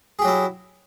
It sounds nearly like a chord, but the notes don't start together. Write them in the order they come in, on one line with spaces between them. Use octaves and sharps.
G#4 G4 F#3 E4